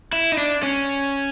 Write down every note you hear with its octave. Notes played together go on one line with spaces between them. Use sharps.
E4
D#4
D4
C#4